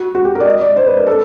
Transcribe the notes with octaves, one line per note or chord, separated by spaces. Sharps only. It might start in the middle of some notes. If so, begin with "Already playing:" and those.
Already playing: F#4
F#4
G4
A#4
D5
D#5
D5
C5
B4
A#4
A4